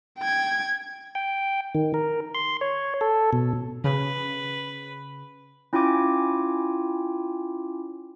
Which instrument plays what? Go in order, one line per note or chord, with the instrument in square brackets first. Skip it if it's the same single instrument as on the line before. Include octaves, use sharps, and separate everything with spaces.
[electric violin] G5 G#6
[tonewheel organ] G5
D#3
A#4
C6
C#5
A4
B2
[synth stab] C#3 [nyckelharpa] B4
[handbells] C#4 E4 F4 G5 G#5 D6